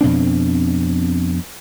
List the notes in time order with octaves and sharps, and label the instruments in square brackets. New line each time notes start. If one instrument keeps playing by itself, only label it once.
[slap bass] F2 B2 C4 D4